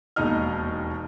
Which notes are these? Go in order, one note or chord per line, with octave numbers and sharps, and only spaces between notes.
E1 D#2 D#4 D#5 F6